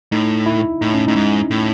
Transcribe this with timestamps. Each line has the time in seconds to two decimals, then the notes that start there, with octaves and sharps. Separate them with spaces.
0.12 A2 D#4
0.46 E4
0.81 A2 D#4
0.94 C#4
1.08 A2 D#4
1.16 G#2
1.51 A2